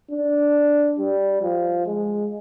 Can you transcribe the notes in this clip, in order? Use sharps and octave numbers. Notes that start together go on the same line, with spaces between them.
D4
G3
F3
G#3